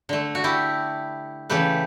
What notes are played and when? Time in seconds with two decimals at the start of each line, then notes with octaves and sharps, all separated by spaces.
0.09 D3 A3
0.35 F#4
0.44 E4 G4
1.50 C#3 E3 A3 G4 B4